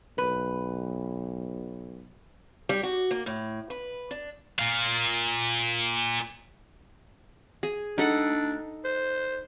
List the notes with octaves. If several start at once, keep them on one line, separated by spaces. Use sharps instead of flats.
B1 B4
G3
F#4
A#3
A2
B4
D4
A#2 F5
G#4
D4 D#4 A4 F#5
C5